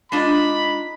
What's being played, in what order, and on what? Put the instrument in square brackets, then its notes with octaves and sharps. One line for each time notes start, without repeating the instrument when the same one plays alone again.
[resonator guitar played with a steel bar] G#3 D4 F4 [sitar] D#4 [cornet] B5